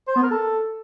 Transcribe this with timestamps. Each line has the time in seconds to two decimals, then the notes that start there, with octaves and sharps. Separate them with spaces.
0.08 C5
0.15 B3
0.23 A#4
0.31 A4